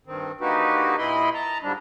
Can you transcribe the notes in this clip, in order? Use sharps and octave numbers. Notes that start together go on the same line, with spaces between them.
G2 D#3 C4
D3 A#3 D#4 F#4 G4 B4
A#2 E4 D#5 B5 C6
A5 A#5
G#2 D3 F3 G3 D4